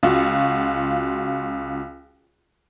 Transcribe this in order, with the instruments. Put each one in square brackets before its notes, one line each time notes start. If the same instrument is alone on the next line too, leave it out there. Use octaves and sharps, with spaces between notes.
[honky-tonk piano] C#2 F4 F#4